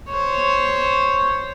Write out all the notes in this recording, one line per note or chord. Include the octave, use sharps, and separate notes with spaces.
C5 C#5